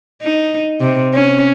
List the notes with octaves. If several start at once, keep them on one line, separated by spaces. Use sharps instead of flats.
D#4
C3
C#4